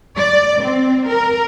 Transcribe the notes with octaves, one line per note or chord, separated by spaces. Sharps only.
D5
C4
A#4